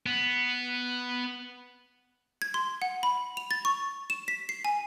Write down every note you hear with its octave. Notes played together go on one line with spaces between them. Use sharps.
B3
G#6
C6
F#5
B5
F7
A6
C#6
E7
B6
C7
G#5